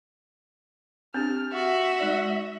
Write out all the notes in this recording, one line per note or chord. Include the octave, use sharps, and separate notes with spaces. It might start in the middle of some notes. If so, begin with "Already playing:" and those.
C4 D4 G4 F6
F#4 E5
G#3 D#4 D5